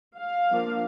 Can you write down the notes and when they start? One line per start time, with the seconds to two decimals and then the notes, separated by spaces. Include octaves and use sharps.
0.19 F5
0.50 F3 A#3 D4